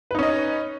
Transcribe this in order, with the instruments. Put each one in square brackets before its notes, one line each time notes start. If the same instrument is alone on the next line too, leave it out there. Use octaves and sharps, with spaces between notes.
[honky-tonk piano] B4
D#4
C#4
D#5